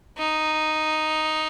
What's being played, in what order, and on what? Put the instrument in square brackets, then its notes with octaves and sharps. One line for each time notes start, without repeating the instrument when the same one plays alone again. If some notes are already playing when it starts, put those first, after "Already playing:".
[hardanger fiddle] D#4